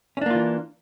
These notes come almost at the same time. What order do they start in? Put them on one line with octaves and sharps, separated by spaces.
C#4 D4 A#3 F4 E3